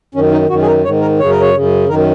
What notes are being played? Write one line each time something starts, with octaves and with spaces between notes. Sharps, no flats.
F#2 D#3 C#4
D#4
F#2 D#3 F#4
G#4
A#4
G#2 D#3 C#5
A#4
F#2 C#3 C#5
A#4
C#5
F#2 C#3
F#2 D#3 A#4